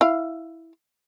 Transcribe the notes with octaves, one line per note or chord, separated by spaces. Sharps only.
E4 F5